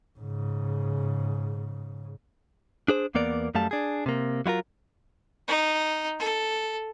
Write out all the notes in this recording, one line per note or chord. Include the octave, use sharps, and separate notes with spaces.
G#2 C#3
D4 G#4 C5
E2 A#3 B3 A#4 D5
F#2 G3 A3 F5 A5
D4 G#4
C3 A#3
F#3 E4 F4 A#4
D#4
A4